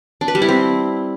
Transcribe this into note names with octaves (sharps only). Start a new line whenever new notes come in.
D4
B4
G3
E4
C4